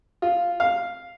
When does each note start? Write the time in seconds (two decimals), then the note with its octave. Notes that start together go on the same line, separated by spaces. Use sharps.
0.22 F4
0.60 F5